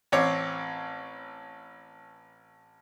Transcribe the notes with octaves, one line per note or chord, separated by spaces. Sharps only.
A1 C4 C#5 D6